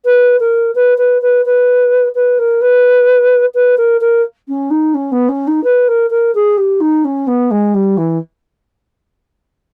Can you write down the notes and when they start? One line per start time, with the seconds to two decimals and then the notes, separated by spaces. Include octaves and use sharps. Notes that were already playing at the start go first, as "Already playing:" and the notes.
0.04 B4
0.39 A#4
0.75 B4
0.97 B4
1.21 B4
1.45 B4
2.14 B4
2.38 A#4
2.61 B4
3.54 B4
3.77 A#4
4.00 A#4
4.48 C#4
4.70 D#4
4.94 C#4
5.11 B3
5.28 C#4
5.47 D#4
5.63 B4
5.88 A#4
6.10 A#4
6.34 G#4
6.57 G4
6.80 D#4
7.04 C#4
7.27 B3
7.50 G#3
7.74 G3
7.97 E3